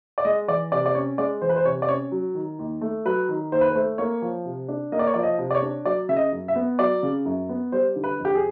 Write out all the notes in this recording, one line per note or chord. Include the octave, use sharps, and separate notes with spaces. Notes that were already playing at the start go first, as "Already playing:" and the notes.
D5
G#3 D#5
E3 D5
C3 D5
D5
C#4 C#5
G#3 D5
E3 C5
B4
C5
C3 C#5
D5
C#4 C#5
F#3
D#3
D#2
A3
F#3 B4
D#3
D#2 C5
B4
C5
A3
A#3 C#5
F3
C3
D4
A#3 D#5
D5
C#5
F3 D5
D#5
C3
D5
C#5
D4
F#3 D5
C#3 E5
D#5
F#2
E5
B3
F#3 D5
C#3
F#2
B3
G3 C5
D3
B4
F2
G4
G#4